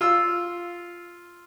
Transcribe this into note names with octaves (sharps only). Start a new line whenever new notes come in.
F4 E6